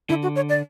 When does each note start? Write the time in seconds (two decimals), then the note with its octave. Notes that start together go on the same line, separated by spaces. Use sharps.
0.09 D3 E4
0.23 F#4
0.36 C#5
0.49 D5